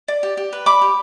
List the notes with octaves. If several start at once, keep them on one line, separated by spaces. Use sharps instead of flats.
D5
G4
G4
B4
D5 B5 D6
G4